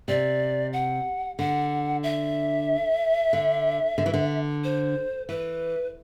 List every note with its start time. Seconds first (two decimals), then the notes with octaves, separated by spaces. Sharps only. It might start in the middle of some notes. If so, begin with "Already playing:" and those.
0.08 C3 D5
0.73 F#5
1.38 D3 F#5
2.03 E5
3.33 D3
3.98 D3
4.06 E3
4.14 D3
4.64 C5
5.29 E3 B4